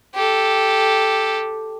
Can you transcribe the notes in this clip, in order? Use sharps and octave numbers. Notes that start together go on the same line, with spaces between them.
G4 A4